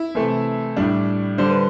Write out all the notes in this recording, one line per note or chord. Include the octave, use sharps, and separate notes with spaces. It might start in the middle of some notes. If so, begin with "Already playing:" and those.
Already playing: E4
C3 E3 A3
A2 G3 D4
D3 G3 C5
B4